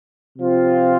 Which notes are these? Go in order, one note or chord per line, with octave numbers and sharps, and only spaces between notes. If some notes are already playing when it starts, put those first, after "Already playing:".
C3 F3 C4 F4